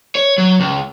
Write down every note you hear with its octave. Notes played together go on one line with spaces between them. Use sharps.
C#5
F#3
C#2